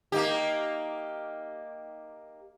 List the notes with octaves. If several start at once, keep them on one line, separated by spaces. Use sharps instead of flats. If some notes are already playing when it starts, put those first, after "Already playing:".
A#3 D#4 G4